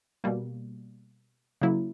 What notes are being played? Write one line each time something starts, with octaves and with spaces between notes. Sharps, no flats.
B2 G3 A#3
C#3 F#3 A#3 E4